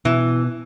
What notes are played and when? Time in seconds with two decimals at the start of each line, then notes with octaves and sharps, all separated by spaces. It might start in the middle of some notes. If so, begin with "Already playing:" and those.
0.05 B2 E3